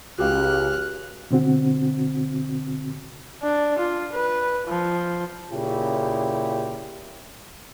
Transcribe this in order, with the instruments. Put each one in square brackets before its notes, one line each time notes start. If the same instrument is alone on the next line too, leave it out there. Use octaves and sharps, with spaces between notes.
[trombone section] C#2 [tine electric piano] F#4 G4 F5 [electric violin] F6 F#6
[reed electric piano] B2 D3 C4 F#4
[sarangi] D4
F4
B4
F3
[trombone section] A#2 C#3 E4 G4